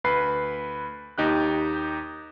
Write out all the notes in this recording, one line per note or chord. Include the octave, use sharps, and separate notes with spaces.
D2 B4 B5 C7
D#2 D#4 G4 F#6